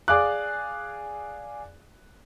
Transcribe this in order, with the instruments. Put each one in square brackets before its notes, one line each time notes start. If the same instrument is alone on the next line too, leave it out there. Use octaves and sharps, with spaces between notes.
[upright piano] G#4 D5 F5 D6 F#6